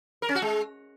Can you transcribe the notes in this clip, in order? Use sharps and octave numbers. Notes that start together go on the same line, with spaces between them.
A#4
C#4
F#4
G#3